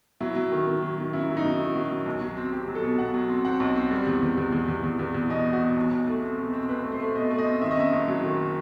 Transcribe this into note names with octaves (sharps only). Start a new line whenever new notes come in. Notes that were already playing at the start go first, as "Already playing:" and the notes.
F#3 E4
F#3
D#3
D#3
F#3
D#3
F#2 E4
F#3
D#4
F#2
D#3 E4
F#3
F#3
B1
F#3
C4
C4 G4
F#3
A4
B2
B2 F#5
F#3
C4
C4 F#5
B1
C4
G3
E2
E2
E2
E2
E2
E2
E2
E2
B2 D#5
B2
F#4
B2
B1
B1
A3
C4
B2
C4
C4 B4
A3
C5
A3
B2 D#5
A3
D#5
C4
D#3 E5
D#5
F#2 E5
F#1
F#3
D#3